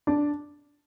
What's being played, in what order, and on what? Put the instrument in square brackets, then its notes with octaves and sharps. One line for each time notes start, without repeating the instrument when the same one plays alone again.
[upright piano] D4